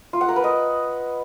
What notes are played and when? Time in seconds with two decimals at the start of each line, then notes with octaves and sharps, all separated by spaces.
0.13 F4
0.21 F#5
0.28 A#4
0.36 B4
0.44 D#5